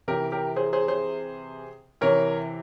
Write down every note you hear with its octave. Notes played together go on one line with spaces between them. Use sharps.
C3 E3 G4 A#4
G4 A#4
G#4 C5
G#4 C5
G#4 C5
C3 E3 A#4 C#5